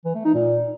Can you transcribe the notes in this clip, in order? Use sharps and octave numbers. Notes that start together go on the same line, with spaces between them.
E3
A3
D#4
A#2